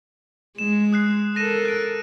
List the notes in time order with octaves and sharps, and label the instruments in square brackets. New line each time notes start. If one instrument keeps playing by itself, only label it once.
[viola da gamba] G#3 [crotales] E7
[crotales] D#6 F#6 C7
[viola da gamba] A4 A#4 [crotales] A#6 D#7 E7
[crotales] F#6 D7